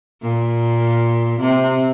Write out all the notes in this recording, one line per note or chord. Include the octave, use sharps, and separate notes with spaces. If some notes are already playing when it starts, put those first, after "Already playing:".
A#2
C3